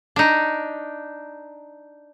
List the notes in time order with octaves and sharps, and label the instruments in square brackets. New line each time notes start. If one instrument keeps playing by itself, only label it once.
[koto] D4 D#4